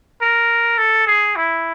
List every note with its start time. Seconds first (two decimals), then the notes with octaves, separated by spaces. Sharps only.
0.22 A#4
0.78 A4
1.07 G#4
1.36 E4